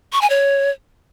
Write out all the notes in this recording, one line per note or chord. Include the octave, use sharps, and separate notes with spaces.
C#6
G#5
C#5